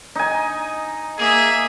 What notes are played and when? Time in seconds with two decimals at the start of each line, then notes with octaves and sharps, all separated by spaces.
0.15 D#4 G#5
1.18 A#3 G#4 E5